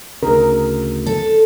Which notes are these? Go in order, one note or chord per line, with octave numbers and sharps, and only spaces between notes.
D2 C#3 A#4
A4